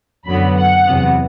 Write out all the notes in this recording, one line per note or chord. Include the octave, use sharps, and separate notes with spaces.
F#2 D3 F#3 B3 B5
F#5
E2 C3 F#3 B3